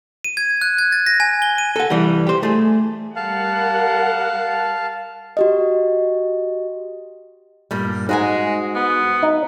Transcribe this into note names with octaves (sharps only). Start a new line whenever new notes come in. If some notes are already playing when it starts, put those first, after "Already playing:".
D#7
G#6
F#6
G#6
A6
A#6
G#5
G7
D#7
A4 F#5
C2 E3 G3
G4 C5
A3 G#4
G3 A#4 F5 F#5 A5
F#4 G4 D#5
G2 A#2 G3
G#2 G#3 F#4 D#5 G#5
B3
D#4